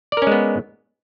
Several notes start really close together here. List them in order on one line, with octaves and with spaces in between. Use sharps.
D5 A#4 C#4 G#3 B3